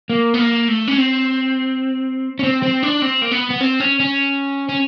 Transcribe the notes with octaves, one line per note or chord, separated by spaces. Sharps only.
A#3
B3
A#3
A3
C#4
C4
C#4
C4
C4
D4
C4
A#3
B3
B3
C4
C#4
C#4
C#4